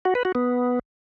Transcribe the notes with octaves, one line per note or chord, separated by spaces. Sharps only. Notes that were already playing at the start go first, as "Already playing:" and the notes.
F#4
B4
F#4
B3